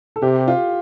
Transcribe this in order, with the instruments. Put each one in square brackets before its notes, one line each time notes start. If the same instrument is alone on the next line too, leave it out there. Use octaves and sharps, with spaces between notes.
[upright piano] A4
[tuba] C3 [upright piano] G4
[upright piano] F4